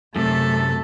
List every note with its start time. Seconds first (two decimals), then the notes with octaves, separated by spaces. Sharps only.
0.16 F#2 C3 A3 A4